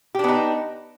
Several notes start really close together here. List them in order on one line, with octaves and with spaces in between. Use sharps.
G4 D4 B3 D#4